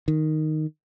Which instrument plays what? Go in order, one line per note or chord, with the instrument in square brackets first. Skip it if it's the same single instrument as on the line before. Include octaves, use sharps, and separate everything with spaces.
[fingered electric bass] D#3